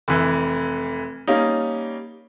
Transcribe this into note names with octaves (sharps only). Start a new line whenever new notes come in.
F1 E3
G3 A#3 C#4 D#4